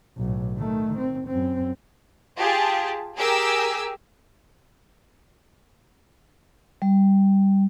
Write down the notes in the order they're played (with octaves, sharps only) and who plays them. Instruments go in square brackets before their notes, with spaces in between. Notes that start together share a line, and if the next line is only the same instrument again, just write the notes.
[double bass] B1 A2
D#3 A3
C4
F#2 C4
[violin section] F4 G4 G#4 A5
G4 G#4 A#4 G#5 D6 E6
[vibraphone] G3